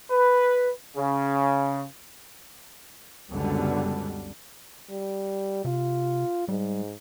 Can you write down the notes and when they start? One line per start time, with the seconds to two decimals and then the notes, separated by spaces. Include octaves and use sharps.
0.11 B4
0.97 C#3
3.31 C#2 F#2 B2 D3 G3 B3
4.90 G3
5.65 C3 F4
6.48 G#2 G3